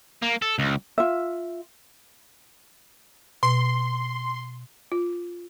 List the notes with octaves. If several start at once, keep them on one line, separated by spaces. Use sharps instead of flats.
A#3
A4
C#2
F4 E5
B2 C6
F4